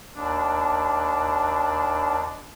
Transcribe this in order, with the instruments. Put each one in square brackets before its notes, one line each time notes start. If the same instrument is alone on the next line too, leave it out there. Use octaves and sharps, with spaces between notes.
[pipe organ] D#2 D4